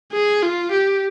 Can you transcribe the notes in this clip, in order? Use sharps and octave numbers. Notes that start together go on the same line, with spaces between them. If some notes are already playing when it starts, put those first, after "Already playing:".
G#4
F4
G4